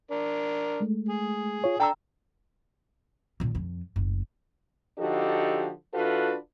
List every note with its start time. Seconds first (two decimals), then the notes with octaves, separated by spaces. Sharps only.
0.11 D4 A#4
0.80 G#3 A3
1.09 G#4
1.64 F4 C#5
1.80 D4 A4 G5 A#5 E6
3.40 D#2 A#2
3.55 F2
3.96 F#1 D2
4.99 D3 F3 D#4 F#4 G4 A4
5.94 E3 D4 F4 F#4 A4 B4